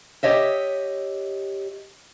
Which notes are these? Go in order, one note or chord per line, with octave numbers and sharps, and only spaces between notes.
G4 C#5 D#5 E5